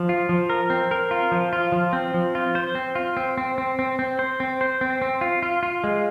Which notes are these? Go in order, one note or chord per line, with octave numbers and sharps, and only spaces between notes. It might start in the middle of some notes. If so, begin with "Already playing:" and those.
Already playing: F3
F4
F3
A#4
C4
A#4
F4
F3
F4
F3
C4
F3
F4
C5
C4
F4
C4
C4
C4
C4
C4
C5
C4
C5
C4
C4
F4
F4
F4
G#3